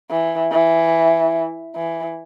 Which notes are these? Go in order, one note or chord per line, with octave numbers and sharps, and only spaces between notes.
E3
E3
E3